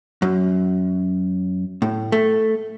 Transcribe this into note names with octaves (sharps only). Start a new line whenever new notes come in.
F#2
A2
A3